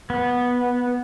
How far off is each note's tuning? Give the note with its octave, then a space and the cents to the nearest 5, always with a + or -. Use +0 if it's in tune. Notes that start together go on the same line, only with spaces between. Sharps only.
B3 -10